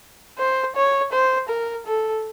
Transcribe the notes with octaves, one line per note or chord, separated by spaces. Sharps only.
C5
C#5
C5
A#4
A4